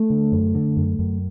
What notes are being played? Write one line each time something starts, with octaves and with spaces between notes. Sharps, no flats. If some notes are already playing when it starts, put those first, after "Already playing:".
Already playing: A3
D3
F#2
D3
F#2
F#2